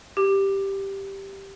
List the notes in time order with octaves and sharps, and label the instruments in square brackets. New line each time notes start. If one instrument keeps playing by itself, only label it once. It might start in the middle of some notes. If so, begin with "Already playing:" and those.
[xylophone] G4